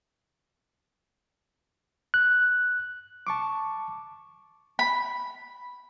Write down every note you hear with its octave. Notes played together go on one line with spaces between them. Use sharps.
F#6
A5 C#6 D6
B5